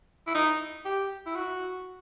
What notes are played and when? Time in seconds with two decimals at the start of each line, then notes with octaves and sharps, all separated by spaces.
0.27 E4
0.34 D#4
0.85 G4
1.26 E4
1.36 F#4